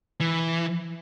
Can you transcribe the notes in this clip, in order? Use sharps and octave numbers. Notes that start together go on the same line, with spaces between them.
E3